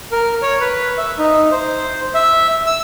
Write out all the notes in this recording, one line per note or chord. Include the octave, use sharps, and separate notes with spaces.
A#4
C#5
B4
E5
D#4
C5
E5
E6